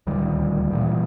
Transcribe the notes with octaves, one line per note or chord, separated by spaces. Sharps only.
D#1 D2 D#3 G3
G2 A#2 E3